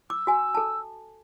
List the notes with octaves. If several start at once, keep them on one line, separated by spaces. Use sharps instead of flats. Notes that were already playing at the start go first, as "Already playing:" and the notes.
D6 E6
F#4 G#5
A4 A5